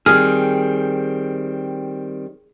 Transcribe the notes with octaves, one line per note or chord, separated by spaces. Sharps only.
D#3 G3 C4 G#4 F6